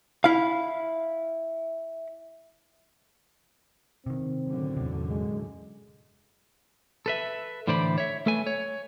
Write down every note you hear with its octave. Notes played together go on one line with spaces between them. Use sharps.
E4 F5
C3 D#3 C4
F#2 A2 D3
E2 C3
G#3
A4 B4 E5
A2 D3 E3 C5 D5 B5
C#5 E5
A3 A4 B4 G#5
C#5